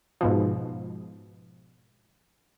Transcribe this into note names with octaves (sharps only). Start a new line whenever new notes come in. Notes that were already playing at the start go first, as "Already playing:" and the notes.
G#2 B2 F3